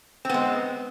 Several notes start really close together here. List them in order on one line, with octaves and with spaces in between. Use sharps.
C4 B3 G#3